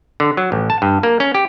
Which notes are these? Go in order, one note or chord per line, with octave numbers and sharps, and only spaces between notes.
D3
F#3
A1
A5
G2
A#3
C#4
G4